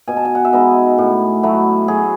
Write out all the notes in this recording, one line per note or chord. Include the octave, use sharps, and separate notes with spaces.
B2 G#5
A5
G#5
F#5
E5
G#3 B3 D#4 D#5
A2
F#3 A3 E4
F#3 G#4